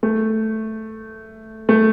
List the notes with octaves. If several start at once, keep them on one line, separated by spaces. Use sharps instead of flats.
A3
A3